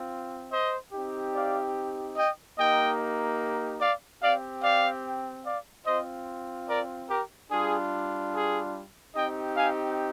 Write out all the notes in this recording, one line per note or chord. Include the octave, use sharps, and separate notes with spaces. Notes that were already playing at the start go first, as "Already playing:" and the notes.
Already playing: C4 F4
C5 D#5
C4 D#4 G4
D5 F5
D#5 G5
A#3 D#4 G4 D#5 G5
D5 F5
C4 G4 D5 F5
D5 F5
D5 F5
C4 F4 C5 D#5
A#4 D5
G4 A#4
G3 D4 F4 G#4
G#4
C4 D#4 G4 D#5 G5
F5 G#5